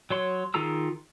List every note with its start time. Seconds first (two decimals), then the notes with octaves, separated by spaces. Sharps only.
0.10 F#3 C#5 C6
0.54 D#3 F4 G#4 A#5 E6